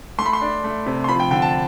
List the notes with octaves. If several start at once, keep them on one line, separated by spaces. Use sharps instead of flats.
A3 C6
B5
C6
D4
A3
C3
C6
F3 B5
G5
D3 G5
A5